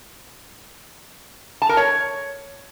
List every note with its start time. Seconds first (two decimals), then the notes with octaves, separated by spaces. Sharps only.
1.62 A5
1.69 A#4
1.77 C#5